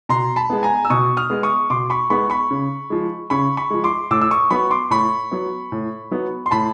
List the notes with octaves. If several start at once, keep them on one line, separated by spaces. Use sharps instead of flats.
B2 A#5 C6
A5 B5
G#3 B3
G#5 A#5
E6
B2 C#6 D#6
D#6 F6
G#3 B3
C#6 D#6
B2 C6 D6
B5 C#6
G#3 B3 B5 C#6
B5 C#6
C#3
F3 G#3
C#3 B5 C#6
B5 C#6
F3 G#3
C6 D6
A2 D6 E6
E6
C#6 D#6
F#3 B3 B5 C#6
C6 D6
A2 B5 C#6
F#3 B3
A2
F#3 B3
C6
A2 A5 B5